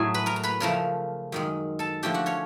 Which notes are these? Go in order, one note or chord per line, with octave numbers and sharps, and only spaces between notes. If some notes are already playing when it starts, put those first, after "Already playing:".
Already playing: A2 F#3 A3 G#4 G#5
B4 B5
A#4 A#5
A#5
B4 B5
C#3 F3 A3 A#4 A#5
F#2 D#3 G#3
A4 A5
D3 F3 A3 D4 G4 G5
F#4 F#5
C#4 C#5